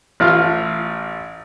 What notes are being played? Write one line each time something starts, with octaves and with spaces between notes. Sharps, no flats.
A1 A2 F4 F6